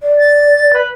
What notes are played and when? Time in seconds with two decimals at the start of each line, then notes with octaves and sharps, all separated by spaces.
0.03 D5
0.18 A6
0.73 B4